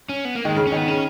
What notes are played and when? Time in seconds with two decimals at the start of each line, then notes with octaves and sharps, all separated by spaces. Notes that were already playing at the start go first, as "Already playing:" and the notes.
0.09 C#4
0.25 B3
0.35 A#3
0.45 D#3 G#3
0.56 C#3
0.67 C#4
0.72 D#3
0.77 B3
0.87 C#3 C#4